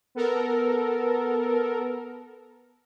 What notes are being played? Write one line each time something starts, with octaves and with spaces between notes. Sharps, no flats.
B3 A4 A#4